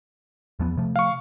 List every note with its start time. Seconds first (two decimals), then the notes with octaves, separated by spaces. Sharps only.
0.60 E2 F3 B3
0.77 C3 F3 A3
0.96 F5 C#6